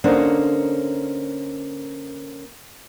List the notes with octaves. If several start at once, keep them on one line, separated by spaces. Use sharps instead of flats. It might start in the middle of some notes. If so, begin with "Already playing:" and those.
D3 A#3 C#4 D#4 C5